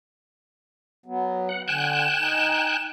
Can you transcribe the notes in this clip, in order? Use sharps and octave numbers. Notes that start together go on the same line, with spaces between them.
F#3 B3
F#5
D3 G5 G#5 F#6 E7
D#4